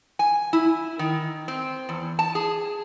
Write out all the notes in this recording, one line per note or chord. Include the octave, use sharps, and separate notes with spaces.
G#5
E4
D#3
C4
E2
A5
G#4